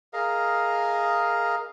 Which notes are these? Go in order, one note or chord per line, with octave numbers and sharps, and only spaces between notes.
G#4 A#4 D#5 F5